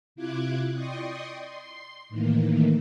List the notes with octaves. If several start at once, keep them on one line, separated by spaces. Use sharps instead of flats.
C3 E4 F4 D6 F#6 G#6
D5 D#5 G5 C6 C#6 D#6
C6
A2 D#3 E3 A#3